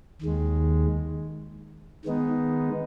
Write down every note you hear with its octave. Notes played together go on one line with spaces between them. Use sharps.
D#2 D#3 G#3
D#3 G#3 B3 D#4